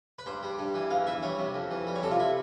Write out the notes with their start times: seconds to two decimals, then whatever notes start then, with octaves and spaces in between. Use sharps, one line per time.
0.19 B4
0.26 G2 C5
0.43 G3
0.59 G2
0.74 E3
0.90 E2 F5
1.07 E3 E5
1.23 G3 C#5
1.39 C3
1.54 F2
1.71 E3
1.87 G3
1.95 C#5
2.03 C3 A4
2.11 F4
2.19 E4